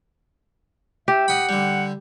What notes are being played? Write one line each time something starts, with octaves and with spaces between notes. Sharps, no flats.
G4 E5
D#5 F#5 B5
D3 G3